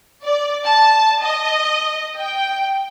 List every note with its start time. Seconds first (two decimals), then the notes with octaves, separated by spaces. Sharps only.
0.24 D5
0.66 A5
1.24 D#5
2.21 G5